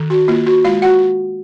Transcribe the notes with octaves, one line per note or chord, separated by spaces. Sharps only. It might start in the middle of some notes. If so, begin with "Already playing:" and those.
Already playing: D#3
F#4
A#3 F4
F#4
G#3 F4 F5
F#4 F#5